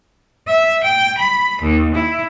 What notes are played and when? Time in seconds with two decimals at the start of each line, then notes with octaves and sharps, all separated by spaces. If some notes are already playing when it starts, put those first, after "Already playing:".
0.46 E5
0.83 G5
1.17 B5
1.62 D#2
1.93 E4